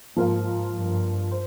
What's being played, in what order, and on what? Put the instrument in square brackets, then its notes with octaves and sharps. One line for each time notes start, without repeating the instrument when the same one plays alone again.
[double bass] G#2 [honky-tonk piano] F3 A#3 F4 A#4 F5
[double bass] G2
[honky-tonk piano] C5